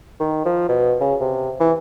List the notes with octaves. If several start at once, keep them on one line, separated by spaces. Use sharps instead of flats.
D#3
F3
B2
C#3
C3
E3